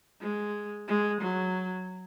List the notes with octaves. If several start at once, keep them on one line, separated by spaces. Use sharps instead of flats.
G#3
G#3
F#3